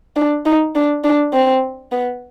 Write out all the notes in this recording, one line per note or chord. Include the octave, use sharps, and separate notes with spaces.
D4
D#4
D4
D4
C4
B3